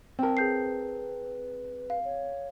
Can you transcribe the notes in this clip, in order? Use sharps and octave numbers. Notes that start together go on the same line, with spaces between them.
C4 A#4 G5 A5
G#4 B4 G6 C7
F5
C#5